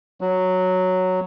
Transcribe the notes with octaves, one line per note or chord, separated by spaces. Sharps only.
F#3